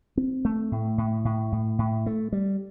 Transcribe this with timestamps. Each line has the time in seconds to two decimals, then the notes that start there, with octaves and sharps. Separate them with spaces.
0.17 C4
0.45 A3
0.72 A2
0.98 A2
1.25 A2
1.52 A2
1.79 A2
2.06 A3
2.32 G3